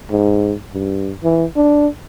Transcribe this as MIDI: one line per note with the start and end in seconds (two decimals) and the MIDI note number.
0.10 0.54 44
0.73 1.12 43
1.24 1.45 52
1.56 1.87 62